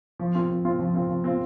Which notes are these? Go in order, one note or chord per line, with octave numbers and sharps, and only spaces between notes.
F3
C4 F4
F3
C4 F4
F3
C4 F4
F3
C4 F4